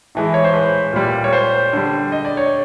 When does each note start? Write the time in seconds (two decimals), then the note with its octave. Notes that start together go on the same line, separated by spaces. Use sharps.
0.15 A2 E3 G#3
0.34 C#5
0.44 C5
0.54 B4
0.93 A#2 G3
1.24 C#5
1.33 C5
1.73 D3 G3
2.12 D#5
2.25 D5
2.37 C#5